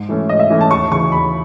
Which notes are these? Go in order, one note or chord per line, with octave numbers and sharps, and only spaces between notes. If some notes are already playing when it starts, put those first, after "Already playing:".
Already playing: G#2
E3 A3 C#4
G#2 D#5
E5
E3 A3 C#4
A5
D#2 C#6
C#3 E3 C#6
D#2 B5